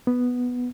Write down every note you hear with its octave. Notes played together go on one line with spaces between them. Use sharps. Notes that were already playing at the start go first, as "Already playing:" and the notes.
B3